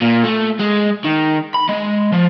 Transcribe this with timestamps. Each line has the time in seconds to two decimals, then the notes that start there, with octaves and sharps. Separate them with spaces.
0.02 A#2
0.24 A3
0.60 G#3
1.04 D#3
1.54 B5
1.69 G#3
2.12 F3